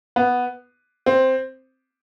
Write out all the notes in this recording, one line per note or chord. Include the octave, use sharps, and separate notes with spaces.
B3
C4